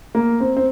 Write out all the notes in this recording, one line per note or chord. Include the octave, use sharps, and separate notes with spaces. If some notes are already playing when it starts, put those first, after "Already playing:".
A#3
C4
C4